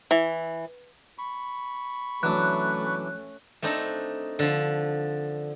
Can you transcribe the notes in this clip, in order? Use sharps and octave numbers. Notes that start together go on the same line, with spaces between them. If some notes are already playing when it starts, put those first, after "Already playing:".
E3
B5 C#6
E3 F#3 A3 C#4 D4 F#6
A3 C4 D4 D#4
D3 F3